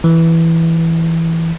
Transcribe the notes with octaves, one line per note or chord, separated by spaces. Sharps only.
E3